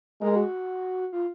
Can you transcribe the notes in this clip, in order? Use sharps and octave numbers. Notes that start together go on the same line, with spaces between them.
G#3 A#4
F#4
F4